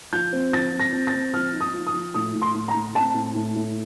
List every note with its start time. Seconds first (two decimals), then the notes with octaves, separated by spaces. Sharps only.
0.12 F3 G6
0.33 C4
0.53 F3 A6
0.73 C4
0.80 A#6
0.93 C4
1.07 A6
1.13 C4
1.34 F3 F6
1.53 D#4
1.61 D#6
1.74 F3
1.87 D#6
1.94 F3
2.14 A2 D#6
2.34 A2
2.42 C6
2.54 A2
2.68 A#5
2.74 A2
2.95 C4 A5
3.14 A2
3.35 A2
3.56 A2